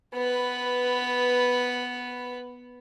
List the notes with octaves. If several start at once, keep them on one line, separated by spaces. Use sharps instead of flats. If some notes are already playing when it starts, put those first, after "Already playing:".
B3 B4